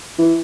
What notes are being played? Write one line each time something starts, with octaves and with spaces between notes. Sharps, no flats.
E3